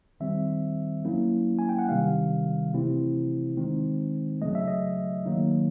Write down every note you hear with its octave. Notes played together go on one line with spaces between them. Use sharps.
D#3 G3 C4 E5
F#3 A#3 C#4 E4
G#5
G5
F#5
C3 D#3 G3 F5
C3 E3 A3 C4 E4
D#3 G#3 C4 D#4
C#3 F#3 A3 D#5
E5
D#5
D#3 F#3 A#3 D#4